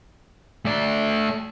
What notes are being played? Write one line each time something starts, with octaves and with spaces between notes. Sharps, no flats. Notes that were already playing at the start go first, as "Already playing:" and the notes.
A3 D5